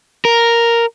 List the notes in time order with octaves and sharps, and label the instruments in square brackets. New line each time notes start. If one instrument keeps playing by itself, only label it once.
[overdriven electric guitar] A#4